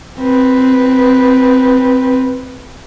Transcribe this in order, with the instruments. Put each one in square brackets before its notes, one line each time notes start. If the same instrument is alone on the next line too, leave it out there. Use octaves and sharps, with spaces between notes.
[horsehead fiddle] C4 B4